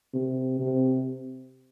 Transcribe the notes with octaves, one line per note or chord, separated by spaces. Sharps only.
C3
C3